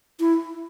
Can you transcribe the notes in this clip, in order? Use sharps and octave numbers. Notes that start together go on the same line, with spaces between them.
E4